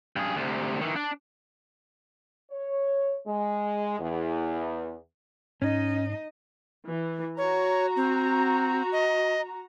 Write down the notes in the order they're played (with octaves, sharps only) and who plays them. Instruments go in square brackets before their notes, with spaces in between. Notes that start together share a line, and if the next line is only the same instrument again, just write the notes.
[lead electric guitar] G2 G#4
D2 C3
D#3 E3
D4
[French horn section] C#5
G#3
E2
[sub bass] G#2 [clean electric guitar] C#4 [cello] D#4 D#5
[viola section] E3
[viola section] F#4 A#5 [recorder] C#5
[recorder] C4
D#5